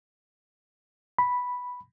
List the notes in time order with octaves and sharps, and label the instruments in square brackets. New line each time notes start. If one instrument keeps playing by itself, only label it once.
[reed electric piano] B5